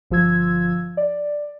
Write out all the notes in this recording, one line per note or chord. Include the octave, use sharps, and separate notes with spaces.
G1 F3 F4 E6 G#6
D5